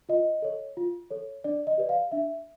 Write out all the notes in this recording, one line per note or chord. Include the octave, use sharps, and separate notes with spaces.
F4 D#5
A4 C#5
F4
A4 C#5
D4 D5
D#5
G4 B4 D5
F5
D4 E5